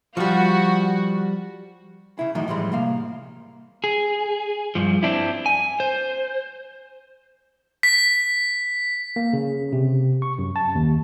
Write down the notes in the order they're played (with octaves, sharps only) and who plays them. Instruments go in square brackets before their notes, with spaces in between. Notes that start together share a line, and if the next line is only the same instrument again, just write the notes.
[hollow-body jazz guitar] F3 G3 [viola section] F#4
[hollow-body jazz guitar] C#3 E4
F#2 A2 D#3 E3
A2 E3 F3 G3 G#3
C2 A#3 F5
[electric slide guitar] G#4
G2 F3
C4 D4 E4
G#5
C5
[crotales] B6
[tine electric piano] A#3
C#3
C3
C#6
F#2
A5
D#2